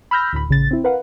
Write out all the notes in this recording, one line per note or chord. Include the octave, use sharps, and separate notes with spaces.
B5 E6 F6 G6 A#6
D2 A2 B5
A1 C#3 A6
C4 E4
A#4 B4 F5 F#5